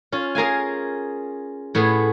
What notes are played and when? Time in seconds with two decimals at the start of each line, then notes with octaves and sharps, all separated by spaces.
0.12 C#4 F4
0.35 G#4 A#4 F5 G#5
1.75 A2 B3 G#4